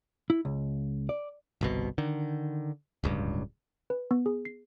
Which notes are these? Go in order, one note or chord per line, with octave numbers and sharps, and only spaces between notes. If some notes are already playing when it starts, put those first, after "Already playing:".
E4
C#2
D5
G1 C2 B2
D3 D#3
D1 C#2 G2
B4
B3
G#4
C7